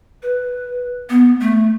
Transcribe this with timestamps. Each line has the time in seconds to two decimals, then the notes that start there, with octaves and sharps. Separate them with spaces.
0.23 B4
1.10 B3
1.40 A3